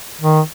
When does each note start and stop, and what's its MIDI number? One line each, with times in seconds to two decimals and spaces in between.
0.21 0.41 51